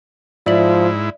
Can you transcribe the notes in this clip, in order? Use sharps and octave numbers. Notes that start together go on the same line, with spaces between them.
G#2 F3 E4 D5 E5 F#7